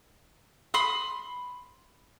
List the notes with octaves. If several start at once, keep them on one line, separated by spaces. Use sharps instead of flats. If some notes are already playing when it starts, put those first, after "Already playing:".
B5 C6 D#6